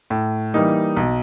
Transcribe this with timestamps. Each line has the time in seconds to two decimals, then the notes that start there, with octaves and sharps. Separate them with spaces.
0.10 A2
0.54 E3 G3 A#3 D#4
0.96 B1